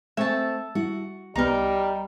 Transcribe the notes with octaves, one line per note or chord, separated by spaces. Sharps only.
A3 C4 E5 G#5 A5 C#6
G3 E4 F#4
C2 G3 B3 D#4 A#4 B5